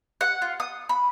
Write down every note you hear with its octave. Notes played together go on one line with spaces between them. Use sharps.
F#5
F4
D#6
B5